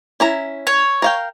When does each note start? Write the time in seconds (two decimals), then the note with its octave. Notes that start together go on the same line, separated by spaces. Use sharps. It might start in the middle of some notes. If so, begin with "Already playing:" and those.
0.20 C#4 E4 A#5
0.67 C#5
1.02 A#4 F5 G5